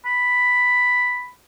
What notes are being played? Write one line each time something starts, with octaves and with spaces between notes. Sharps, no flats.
B5